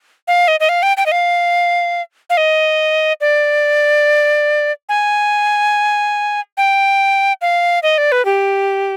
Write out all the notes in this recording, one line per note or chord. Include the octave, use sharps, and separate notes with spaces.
F5
D#5
D#5
F5
G5
G5
D#5
F5
F5
D#5
D5
G#5
G5
F5
D#5
D5
B4
G4